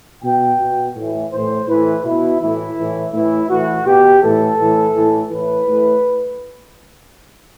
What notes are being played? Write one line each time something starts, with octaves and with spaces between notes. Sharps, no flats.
B2 G5
B2
A2 E3
A2 E3 C5
A2 E3 B4
B2 E4
A2 E3 E4
A2 E3
A2 E3 E4
A2 E3 F#4
B2 G4
A2 E3 A4
A2 E3
A2 E3
A2 E3 B4
A2 E3